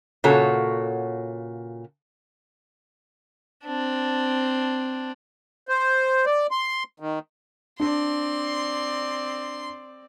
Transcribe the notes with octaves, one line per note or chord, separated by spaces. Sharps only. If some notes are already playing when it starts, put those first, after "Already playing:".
A#2 C#3 F#4 A4 C#5
C4 D4
C5
D5
C6
D#3
C4 D4 D5 C6